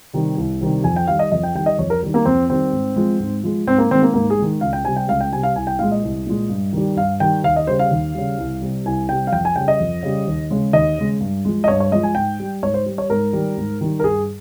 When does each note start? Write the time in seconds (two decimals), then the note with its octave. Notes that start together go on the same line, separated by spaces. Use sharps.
0.14 C3 D#3 G3
0.38 C2
0.61 C3 D#3 G3
0.84 F2 G#5
0.96 G5
1.07 D#3 G3 F5
1.19 D#5
1.32 F2 D#5
1.43 G5
1.55 D#3 G3 G5
1.66 D#5
1.79 F2 C#5
1.90 A#4
2.02 D#3 G3
2.14 A#3
2.25 F2 C4
2.50 D#3 G3 C4
2.73 G#2
2.96 F3 G#3
3.20 G#2
3.43 F3 G#3
3.67 G#2 C4
3.78 A#3
3.90 D#3 G#3 C4
4.03 A#3
4.14 G#2 A#3
4.30 G#4
4.38 D#3 G#3
4.61 C#2 F5
4.73 G5
4.84 C3 G3 G#5
4.96 G5
5.08 C#2 F5
5.21 G5
5.32 C3 G3 G#5
5.43 F5
5.56 C2 G#5
5.67 G5
5.79 A#2 G#3 F5
5.92 D#5
6.03 C2
6.27 A#2 G#3
6.49 G2
6.73 D#3 G3
6.96 G2 F5
7.20 D#3 G3 G5
7.44 D#2 F5
7.56 D#5
7.67 C#3 G3 C5
7.79 F5
7.91 D#2
8.14 C#3 G3
8.38 C2
8.62 C3 G3
8.86 C2 G#5
9.09 C3 G3 G5
9.27 F5
9.33 F2 G5
9.45 G#5
9.56 C#3 G3 G5
9.68 D#5
9.80 F2
10.03 C#3 G3
10.27 D#2
10.51 C#3 G#3
10.73 D#2 D#5
10.98 C#3 G#3
11.21 G2
11.45 F3 G#3
11.64 D#5
11.68 G2 C#5
11.80 C#5
11.91 F3 G#3 D#5
12.03 G#5
12.15 G#2 G5
12.39 G3
12.63 G#2 C#5
12.74 C5
12.86 G3
12.98 C#5
13.10 G#2 A#4
13.33 D#3 G3
13.57 G#2
13.81 D#3 G3
14.00 A#4
14.04 G2 G#4